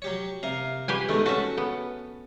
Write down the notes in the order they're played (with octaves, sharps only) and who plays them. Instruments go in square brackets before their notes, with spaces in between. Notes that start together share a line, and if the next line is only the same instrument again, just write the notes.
[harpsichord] F#3 G4 C#5
C3 A#4 F5
[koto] G4 B4 G#5
[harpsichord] G#2 B2 D#3 [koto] A3
[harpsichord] C#4 A4 [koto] F#4 E5
[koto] B3